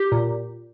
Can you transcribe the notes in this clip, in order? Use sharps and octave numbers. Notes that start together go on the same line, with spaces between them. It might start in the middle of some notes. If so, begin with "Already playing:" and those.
Already playing: G4
A#2